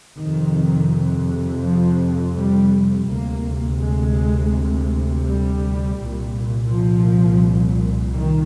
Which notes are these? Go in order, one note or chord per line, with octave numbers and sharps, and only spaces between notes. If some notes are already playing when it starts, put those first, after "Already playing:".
F2 C3 D#3
F3
G3
D2 C3 A#3
G#3
G3
C2 A#2
F3
D#3